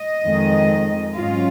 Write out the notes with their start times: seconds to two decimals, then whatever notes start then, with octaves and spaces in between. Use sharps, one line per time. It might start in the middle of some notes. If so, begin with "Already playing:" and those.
Already playing: D#5
0.25 F2 D#3 G#3
1.16 G#2 F#3 C#4 F4